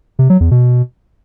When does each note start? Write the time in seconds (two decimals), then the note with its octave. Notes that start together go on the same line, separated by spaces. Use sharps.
0.19 C3
0.30 F#3
0.40 E2
0.51 B2